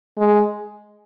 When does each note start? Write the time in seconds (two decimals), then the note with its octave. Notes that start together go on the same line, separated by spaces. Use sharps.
0.18 G#3